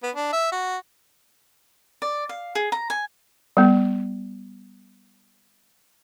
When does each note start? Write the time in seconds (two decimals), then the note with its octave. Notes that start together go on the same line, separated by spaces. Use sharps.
0.03 B3
0.15 D4
0.32 E5
0.52 F#4
2.02 D5
2.29 F5
2.55 G#4
2.72 A#5
2.90 G#5
3.57 G3 B3